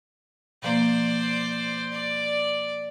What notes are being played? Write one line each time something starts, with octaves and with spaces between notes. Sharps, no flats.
B2 F3 A#3 C5 D5
D5